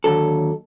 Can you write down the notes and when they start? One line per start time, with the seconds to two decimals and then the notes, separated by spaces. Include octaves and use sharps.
0.04 D#2 D3 F#3 A4